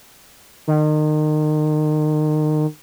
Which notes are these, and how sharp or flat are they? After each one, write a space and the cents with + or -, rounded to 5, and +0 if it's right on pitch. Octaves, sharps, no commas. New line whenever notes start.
D#3 -30